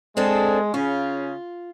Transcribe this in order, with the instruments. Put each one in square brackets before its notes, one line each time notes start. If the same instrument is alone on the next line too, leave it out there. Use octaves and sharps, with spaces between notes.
[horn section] G#3 [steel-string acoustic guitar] C4 D4 A4
[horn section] C#3 C#4 [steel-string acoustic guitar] F4